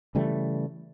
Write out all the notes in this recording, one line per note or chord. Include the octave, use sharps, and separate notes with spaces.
C#3 E3 G3 A3